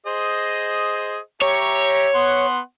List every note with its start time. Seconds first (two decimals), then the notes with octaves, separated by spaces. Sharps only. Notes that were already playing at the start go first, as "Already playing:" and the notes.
0.06 G#4 C5 D#5
1.41 G4 C#5 E5 A#5
2.15 B3 F#5 C6